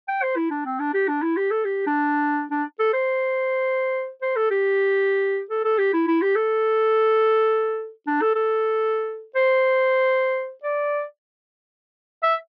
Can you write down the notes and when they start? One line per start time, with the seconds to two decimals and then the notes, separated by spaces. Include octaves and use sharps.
0.08 G5
0.22 C5
0.37 E4
0.51 D4
0.65 C4
0.79 D4
0.94 G4
1.08 D4
1.22 E4
1.37 G4
1.51 A4
1.65 G4
1.87 D4
2.51 D4
2.79 A4
2.93 C5
4.22 C5
4.36 A4
4.51 G4
5.50 A4
5.64 A4
5.78 G4
5.93 E4
6.07 E4
6.22 G4
6.36 A4
8.07 D4
8.21 A4
8.35 A4
9.35 C5
10.64 D5
12.23 E5